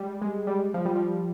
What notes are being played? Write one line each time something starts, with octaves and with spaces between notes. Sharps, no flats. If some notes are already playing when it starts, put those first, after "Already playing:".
Already playing: G3 G#3
G#3
G3
F3
G3
F3